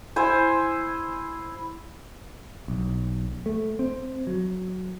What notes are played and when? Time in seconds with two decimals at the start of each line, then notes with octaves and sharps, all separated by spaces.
0.16 E4 C5 G#5
2.68 B1
3.46 A3
3.79 C4
4.27 F#3